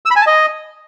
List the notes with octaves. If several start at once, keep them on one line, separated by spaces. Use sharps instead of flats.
E6
B5
G#5
A5
D#5